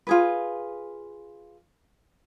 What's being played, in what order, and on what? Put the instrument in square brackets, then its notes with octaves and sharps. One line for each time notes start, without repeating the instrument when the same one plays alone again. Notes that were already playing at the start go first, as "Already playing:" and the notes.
[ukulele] F4 G#4 B4